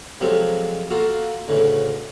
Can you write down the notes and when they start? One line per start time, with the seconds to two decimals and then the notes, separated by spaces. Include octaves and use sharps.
0.20 C3 F3 F#3 G#3 G4 A4
0.90 A#3 F4 F#4 A4
1.48 D2 A2 C#3 E3